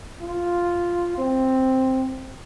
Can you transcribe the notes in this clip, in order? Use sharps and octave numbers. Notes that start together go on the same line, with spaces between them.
F4
C4